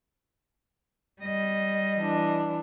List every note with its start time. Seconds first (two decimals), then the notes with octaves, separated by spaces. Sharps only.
1.22 G3 D#5
1.98 E3 D4